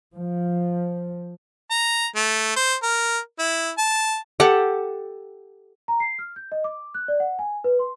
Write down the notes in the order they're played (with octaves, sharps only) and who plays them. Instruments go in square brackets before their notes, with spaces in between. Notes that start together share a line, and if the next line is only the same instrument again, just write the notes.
[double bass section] F3
[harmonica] A#5
A3
C5
A#4
E4
A5
[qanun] G4 A4 F#5
[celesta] A#5
C7
F6
G6
D#5
D6
F#6
D5
F#5
G#5
B4
C6